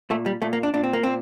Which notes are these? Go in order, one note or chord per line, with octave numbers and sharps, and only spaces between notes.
A#2 A3
G3
A#2 A3
A#3
D4
A#2 D4
C4
A#3
A#2 C4